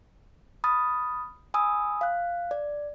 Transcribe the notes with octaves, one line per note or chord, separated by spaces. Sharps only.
B5 D#6 F6 A6
G#5 B5 D#6 E6
F5 F#6
D5